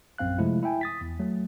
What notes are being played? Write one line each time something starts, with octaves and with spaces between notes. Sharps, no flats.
A#1 F#2 C4 F5 F#6
C3 F3 G#3 A3 E4
E4 E5 G5 G#5
D#6 A6 B6
E2
F#3 A3